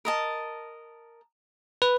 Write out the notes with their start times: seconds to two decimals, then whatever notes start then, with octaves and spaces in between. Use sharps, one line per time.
0.05 A#4 D#5 A5
1.82 B4